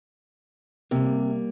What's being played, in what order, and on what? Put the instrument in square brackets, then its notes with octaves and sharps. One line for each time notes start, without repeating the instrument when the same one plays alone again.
[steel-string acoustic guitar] C3 [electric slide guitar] G3 A#3